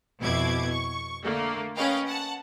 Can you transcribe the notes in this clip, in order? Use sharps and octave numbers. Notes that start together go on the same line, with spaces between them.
F2 B2 E4 D6 G#6
C#6
D3 A3 A#3
C#4 A#4 B4 D#5 F5 G5
F#5 A5